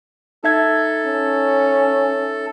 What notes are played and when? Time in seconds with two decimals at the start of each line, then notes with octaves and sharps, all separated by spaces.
0.44 D#4 A4 E5 G#6
1.06 C#4